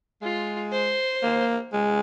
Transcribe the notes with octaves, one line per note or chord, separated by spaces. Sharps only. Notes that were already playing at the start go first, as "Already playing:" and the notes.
G#3 F4
C5
A#3
G#3